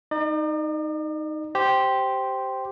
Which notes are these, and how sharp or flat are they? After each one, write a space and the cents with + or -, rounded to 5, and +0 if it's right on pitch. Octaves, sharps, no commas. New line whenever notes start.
D#4 +0 D5 +45
G4 -5 C5 +0